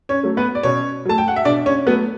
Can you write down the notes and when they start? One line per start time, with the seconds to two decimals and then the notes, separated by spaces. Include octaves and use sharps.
0.09 C#4 C#5
0.23 F#3 A3
0.37 B3 B4
0.55 D5
0.63 B2 C#4 C#5
1.05 F#3 A3 A5
1.18 G5
1.28 F#5
1.36 E5
1.45 B2 D4 D5
1.66 C#4 C#5
1.86 F#3 A3 B3 B4